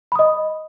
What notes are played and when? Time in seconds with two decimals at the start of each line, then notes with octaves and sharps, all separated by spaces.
0.12 B5
0.15 D#6
0.19 D#5